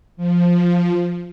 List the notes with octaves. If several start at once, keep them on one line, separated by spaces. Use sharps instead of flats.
F3